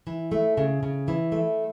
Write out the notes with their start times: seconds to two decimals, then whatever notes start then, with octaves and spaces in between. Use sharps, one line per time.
0.07 E3
0.32 A3
0.57 C#3
0.83 C#3
1.08 E3
1.32 A3